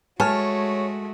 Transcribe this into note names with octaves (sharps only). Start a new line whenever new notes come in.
G#3 A3 F#4 C#5 G#5 A5 F6